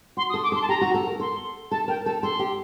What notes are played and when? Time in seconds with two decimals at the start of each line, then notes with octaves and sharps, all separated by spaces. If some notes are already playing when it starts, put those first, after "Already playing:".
0.17 F#4 C6
0.30 D#6
0.34 A4
0.43 D6
0.52 A4 C6
0.62 A5
0.69 G4 A#5
0.81 F#4
0.94 A4
1.07 A#4
1.20 A4 C6
1.71 A4 A5
1.88 A#4 G5
2.05 A4 A5
2.23 A4 C6
2.39 G4